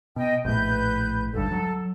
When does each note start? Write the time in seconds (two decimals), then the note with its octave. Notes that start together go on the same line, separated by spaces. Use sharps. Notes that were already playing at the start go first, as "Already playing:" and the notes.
0.16 B2 D#5 G5
0.45 A#1 A2 B4 G6
1.33 G#1 D2 G2 A4
1.52 F#3